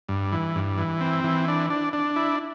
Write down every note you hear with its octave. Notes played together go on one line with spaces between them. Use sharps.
G2
E3
G2
E3
C4
E3
D4
D4
D4
E4